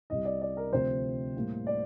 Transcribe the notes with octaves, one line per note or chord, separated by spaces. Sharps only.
C2 C3 G3 D#5
D5
D5
A#4
D2 C3 F3 C4 C5
A2 G3 A#3
D5